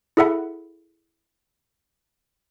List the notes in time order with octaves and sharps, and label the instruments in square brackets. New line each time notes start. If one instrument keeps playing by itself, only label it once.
[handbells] E4 G#4 A4 E5 F#5 B5